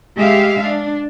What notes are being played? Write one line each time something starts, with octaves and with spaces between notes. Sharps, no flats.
G#3 G4 E5 F5
D4